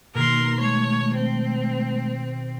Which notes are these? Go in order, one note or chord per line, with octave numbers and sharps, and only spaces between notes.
B2 D#3 A#3 F#4 A#4 C6
G#3 A3 C#5
C4